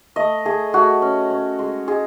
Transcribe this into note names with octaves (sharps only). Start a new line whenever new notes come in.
A3 D#5
A3 G#4
A3 F#4
C#4
C#4
G#3
G#3 G#4